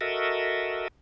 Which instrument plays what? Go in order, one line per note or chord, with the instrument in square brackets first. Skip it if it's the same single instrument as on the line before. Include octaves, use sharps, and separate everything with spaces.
[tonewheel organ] F#4 A4 A#4 D#5 E5